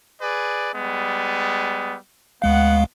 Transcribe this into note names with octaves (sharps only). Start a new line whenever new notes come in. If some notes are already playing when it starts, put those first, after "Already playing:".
G#4 B4 D5
G3 G#3 B3
D2 G#3 B3 F5 F#5